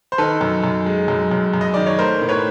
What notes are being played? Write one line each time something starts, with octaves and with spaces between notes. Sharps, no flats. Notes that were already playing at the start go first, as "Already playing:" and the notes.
C5
D#3 A4 B4
F#2
F#2
G#3
F#2
F#2
F#2
D#5
D#3 D5
C#5
A3 A#4 C5
A2
B4 C#5